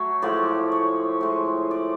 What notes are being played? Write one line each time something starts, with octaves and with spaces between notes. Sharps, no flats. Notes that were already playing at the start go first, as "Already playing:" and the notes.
Already playing: F#3 A3 C#5
A2 F3 G#3 D5
C#5
A2 G#3
D5